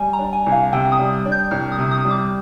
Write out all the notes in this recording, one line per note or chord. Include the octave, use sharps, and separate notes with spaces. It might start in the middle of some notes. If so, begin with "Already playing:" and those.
Already playing: G3 G#5
A#5
D4
G#5
C2
F5
C3 G5
D#6
G3
D4
G6
C2 F6
D#6
C3
D#6
G3
D6